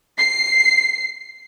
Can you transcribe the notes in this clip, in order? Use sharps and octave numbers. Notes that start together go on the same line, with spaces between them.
C7